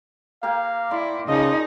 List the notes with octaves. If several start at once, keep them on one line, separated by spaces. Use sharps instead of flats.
A#3 G4 F5 A#5
E4 D5 C6
C#3 F3 D#4 G#4 D#5